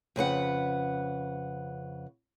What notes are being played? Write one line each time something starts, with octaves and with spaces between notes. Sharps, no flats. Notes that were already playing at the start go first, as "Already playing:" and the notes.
F2 C#3 B4 F#5